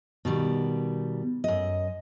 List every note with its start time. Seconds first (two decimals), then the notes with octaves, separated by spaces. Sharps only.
0.25 B2 D#3 G3
1.44 F#2 D#5